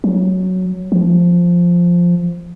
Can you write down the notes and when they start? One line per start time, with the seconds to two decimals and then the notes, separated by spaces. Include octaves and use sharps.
0.04 F#3
0.92 F3